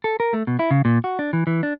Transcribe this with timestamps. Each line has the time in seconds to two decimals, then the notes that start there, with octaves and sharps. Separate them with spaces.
0.04 A4
0.20 A#4
0.33 A3
0.47 B2
0.59 E4
0.71 C#3
0.85 A#2
1.04 F#4
1.19 D4
1.33 E3
1.47 E3
1.63 D4